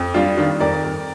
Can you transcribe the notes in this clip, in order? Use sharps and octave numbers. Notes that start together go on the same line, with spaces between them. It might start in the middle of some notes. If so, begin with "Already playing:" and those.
Already playing: F2
G3 D4 F4
D#3 D4 F4
F2 A#4 D5
F2